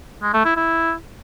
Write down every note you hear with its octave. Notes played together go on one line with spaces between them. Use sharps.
G#3
A3
E4
E4